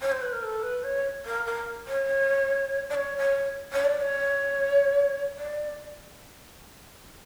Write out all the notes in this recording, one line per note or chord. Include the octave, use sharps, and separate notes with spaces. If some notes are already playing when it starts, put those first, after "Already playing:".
C#5
C5
B4
A#4
A4
B4
C#5
A#4
A#4
C#5
D5
C#5
C#5
C#5
D5
D5
C#5
D5